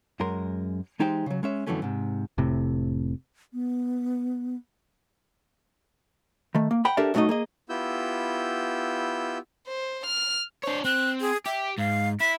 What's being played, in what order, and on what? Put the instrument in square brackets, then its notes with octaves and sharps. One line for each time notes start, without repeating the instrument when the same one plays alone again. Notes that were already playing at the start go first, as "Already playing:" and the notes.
[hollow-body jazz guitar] F#2 G#3 A#4 C6
E3 G#3 D#4 G4 C5 G5
C#3 F#3
G#3 C#4 E5
F2 D3 E3 F#3 A3 C#4
G#2 C3
[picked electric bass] F1 A2 C3
[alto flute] B3
[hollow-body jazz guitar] D#3 A3
A#3
F#5 G5 B5
D4 G4 A4 A#4 D5 E5
F#2 F#3 A3 A#3 D#4 D#5
A#3 G#4 D#5
[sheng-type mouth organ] B3 E4 F4 G4 E6 G6
[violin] C5
F6
[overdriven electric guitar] D4 C#5 [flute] C5
[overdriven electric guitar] C4 [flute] F#6
[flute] G#4
[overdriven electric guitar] G4 [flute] E5
[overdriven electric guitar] G#2 [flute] F5
[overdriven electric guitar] E4 [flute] B6